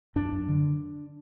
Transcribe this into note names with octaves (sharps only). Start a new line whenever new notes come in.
F#2 D4
F#2
D3